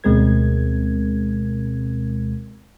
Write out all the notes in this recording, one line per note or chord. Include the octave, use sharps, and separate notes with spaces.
D2 B2 G#3 C4 A#4 G#6